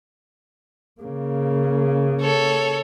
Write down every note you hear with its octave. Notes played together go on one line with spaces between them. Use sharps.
C#3 A#3
A4 C#5